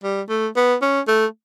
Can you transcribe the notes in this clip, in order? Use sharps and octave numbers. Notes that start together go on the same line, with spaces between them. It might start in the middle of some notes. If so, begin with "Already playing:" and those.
G3
A3
B3
C#4
A3